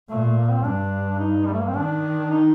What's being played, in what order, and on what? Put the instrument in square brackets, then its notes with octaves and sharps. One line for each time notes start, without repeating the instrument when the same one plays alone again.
[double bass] A#2 [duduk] A3
[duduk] A3
A#3
C4
[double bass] G2 [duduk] D4
[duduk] D#4
G3
A3
A#3
C4
[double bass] D#3 [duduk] D4
[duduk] D#4